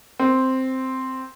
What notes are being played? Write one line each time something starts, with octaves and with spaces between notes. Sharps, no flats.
C4